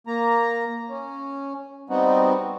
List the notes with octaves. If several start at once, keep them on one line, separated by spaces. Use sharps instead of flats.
A#3 A#5
C#4
G3 B3 C4 D#4 F#4